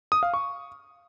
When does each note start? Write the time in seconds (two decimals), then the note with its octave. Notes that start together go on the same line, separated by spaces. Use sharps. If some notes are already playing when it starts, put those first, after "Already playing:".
0.12 D#6
0.23 F5
0.34 C#6